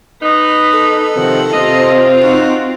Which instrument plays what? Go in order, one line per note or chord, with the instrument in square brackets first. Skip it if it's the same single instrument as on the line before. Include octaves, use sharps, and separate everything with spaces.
[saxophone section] B3 D#4 [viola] B4
[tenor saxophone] A4
[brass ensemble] C3 F3 C4 [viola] D#3 F#5
[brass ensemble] C3 C5 [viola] C4 F4 [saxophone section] D#5
[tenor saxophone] D#4 [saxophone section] F#4